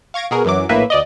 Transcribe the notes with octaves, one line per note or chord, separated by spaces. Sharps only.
F5 C#6 G#6 A#6 D7
B2 F#4 G#4 A#4
F#2 E3 F#3 D6
A#1 A2 A#3 B4 E5
D2 D5 D#5